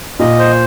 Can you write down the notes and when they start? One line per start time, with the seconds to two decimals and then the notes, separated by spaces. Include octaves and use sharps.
0.20 A#2 D#5
0.39 C5